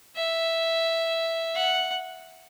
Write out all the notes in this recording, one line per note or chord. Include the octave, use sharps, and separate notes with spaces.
E5
F#5